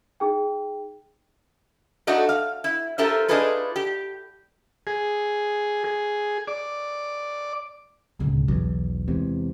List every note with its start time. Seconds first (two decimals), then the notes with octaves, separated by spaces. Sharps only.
0.20 D#4 G#4 G5
2.07 A3 D4 D#4 F#4
2.29 F5
2.64 E4
2.98 F4 G4 A4 A#4 C5 E5
3.28 D4 D#4 F4 G#4 A4 B4
3.76 G4
4.87 G#4
5.84 G#4
6.48 D5
8.19 D1 C#2 B2
8.48 B1 E2 E3
9.08 E2 C3 G#3